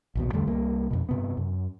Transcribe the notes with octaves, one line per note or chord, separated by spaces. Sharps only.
A#1 D#2 B2
E2 D3 G3 A3
C2 G3 A#3
F2 B2
G2 C3 B3
F#2